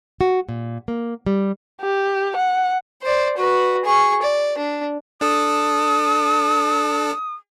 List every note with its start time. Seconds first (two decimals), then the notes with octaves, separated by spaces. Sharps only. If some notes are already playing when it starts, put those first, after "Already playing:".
0.21 F#4
0.49 A#2
0.88 A#3
1.26 G3
1.81 G4
2.37 F#5
3.03 C5 D5
3.38 F#4 B4
3.85 G#4 C#6
4.22 D5
4.58 D4
5.21 D4 A4 D#6